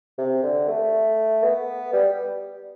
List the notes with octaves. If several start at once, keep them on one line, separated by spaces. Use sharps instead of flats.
C3
D3
A3
B3
G3